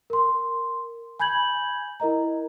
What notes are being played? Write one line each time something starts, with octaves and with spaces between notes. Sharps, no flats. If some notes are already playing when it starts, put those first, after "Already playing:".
A#4 C6
G#5 B5 G6 G#6 F#7
E4 A#4 D#5 A#5